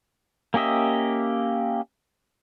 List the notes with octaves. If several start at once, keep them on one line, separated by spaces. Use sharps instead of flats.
A#3 C#4 G4 D#5 E5